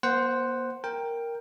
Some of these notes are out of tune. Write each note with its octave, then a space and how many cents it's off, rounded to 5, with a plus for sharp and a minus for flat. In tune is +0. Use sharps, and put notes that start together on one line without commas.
A#3 +45 C5 +0 F#5 +5
A#4 +0 G5 +10